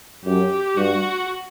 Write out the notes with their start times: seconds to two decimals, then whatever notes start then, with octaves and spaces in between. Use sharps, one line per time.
0.25 F#2 G4
0.76 G2 F#4